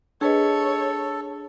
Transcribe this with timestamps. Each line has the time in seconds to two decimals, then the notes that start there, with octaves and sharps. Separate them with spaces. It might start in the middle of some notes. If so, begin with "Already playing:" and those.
0.21 D4 G#4 A4 B4 C#5 D#5